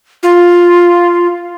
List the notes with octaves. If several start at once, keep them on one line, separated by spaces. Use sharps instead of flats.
F4